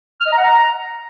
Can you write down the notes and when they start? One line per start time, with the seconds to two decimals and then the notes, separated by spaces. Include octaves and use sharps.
0.21 F6
0.26 D#5
0.32 A#5
0.38 F#5
0.44 A#5